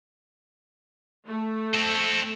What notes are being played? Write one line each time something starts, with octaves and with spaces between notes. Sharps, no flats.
A3
C4 A4